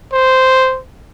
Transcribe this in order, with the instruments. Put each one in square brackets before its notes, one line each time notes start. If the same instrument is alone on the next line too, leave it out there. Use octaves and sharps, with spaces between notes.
[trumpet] C5